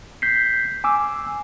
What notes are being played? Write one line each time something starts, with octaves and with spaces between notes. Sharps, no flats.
G6 B6 C7
G#5 D6 E6